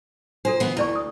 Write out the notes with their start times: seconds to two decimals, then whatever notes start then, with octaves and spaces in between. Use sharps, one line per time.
0.45 D4 F4 A4 C5
0.60 E3 B3
0.77 D2 E4 D5 C#6
0.96 D#6